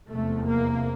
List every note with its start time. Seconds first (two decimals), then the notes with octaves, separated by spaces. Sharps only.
0.10 F1 E2 C3 A3
0.47 A#3